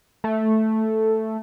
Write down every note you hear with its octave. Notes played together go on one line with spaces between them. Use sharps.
A3